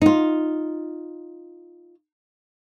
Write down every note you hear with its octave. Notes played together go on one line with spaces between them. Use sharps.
D#4 F4